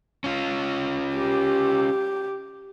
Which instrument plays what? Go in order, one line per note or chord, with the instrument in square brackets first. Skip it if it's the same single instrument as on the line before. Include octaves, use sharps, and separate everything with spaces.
[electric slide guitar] C#4 F4
[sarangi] G4